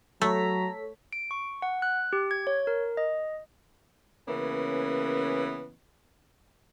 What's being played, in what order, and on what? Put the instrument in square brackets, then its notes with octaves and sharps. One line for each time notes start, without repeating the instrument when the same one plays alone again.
[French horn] F#3 [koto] A3 [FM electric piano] A4 C#5 B6 [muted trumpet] A#5
[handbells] D7
C#6
F#5
F#6
G4
G#6
C#5
A#4
D#5
[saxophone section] C#3 E3 A#3 B3 C#4